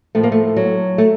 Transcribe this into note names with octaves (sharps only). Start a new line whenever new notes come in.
A2 F3 A3
A#3
A3
F#3
A3